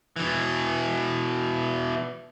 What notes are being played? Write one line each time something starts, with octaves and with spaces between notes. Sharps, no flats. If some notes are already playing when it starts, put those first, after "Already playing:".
B2 E3